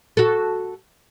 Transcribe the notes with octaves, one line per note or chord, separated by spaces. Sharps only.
F#4 A4